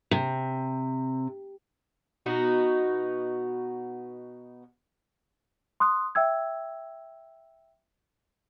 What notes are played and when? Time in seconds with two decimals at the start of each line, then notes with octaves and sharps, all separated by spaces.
0.11 C3
2.26 B2 B3 D#4 F#4
5.80 C6 D#6 F#6
6.15 E5 G5 E6 G#6